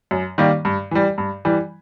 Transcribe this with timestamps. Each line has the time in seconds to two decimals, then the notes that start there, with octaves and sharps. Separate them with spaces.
0.11 F#2
0.38 D#3 G3 A#3
0.65 G2
0.91 E3 G3
1.18 G2
1.45 E3 G3